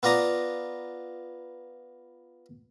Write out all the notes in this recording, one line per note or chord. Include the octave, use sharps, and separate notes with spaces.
B3 F4 D5 A#5 D#6